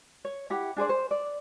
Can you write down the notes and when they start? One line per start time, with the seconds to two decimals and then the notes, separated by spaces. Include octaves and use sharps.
0.25 C#5
0.50 E4 G4 F#5
0.76 D4 G#4 C5 D5
0.89 C5
1.11 D5